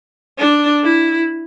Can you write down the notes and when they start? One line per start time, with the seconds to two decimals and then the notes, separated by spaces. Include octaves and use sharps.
0.38 D4
0.84 E4